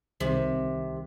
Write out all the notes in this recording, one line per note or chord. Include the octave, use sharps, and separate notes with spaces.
C2 C3 D#3